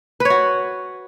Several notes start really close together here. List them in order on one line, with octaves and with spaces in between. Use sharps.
B4 C#5 F#4